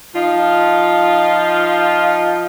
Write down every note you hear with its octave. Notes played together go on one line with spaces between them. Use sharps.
F3 D#4 F4